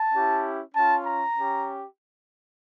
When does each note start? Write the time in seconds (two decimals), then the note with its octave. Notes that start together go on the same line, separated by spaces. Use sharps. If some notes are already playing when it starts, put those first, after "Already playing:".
Already playing: A5
0.12 C#4 E4 G4
0.74 C#4 F4 A5
1.04 A#5
1.35 C#4 G4